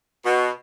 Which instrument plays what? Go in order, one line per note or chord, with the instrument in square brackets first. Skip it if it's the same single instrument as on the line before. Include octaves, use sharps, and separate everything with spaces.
[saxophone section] B2